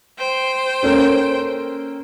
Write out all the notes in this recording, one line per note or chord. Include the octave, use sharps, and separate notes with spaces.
C5 G5
A#3 C#4 A4